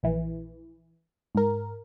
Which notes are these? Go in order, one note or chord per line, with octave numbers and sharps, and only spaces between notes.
A#1 E3
G#2 A#4